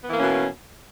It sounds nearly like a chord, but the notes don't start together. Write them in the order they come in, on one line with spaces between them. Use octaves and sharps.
B3 E3 A#3 C#4 B2